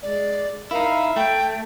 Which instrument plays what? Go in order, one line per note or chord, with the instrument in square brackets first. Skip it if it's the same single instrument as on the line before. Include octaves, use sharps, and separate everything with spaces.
[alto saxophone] G#3 [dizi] D5
[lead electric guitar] D#4 E4 [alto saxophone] A#4 [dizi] F5
[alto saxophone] E5
[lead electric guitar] A3 [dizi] G5